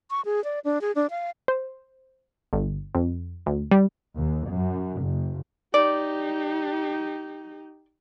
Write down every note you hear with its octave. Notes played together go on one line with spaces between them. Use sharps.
C#6
G#4
D5
D4
G#4
D4
F5
C5
G1
F2
D2
G3
D#2
F#2
F#1
D#4 G4 D5